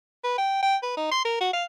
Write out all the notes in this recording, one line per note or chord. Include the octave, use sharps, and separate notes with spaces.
B4
G5
G5
B4
D#4
C6
A#4
F#4
F5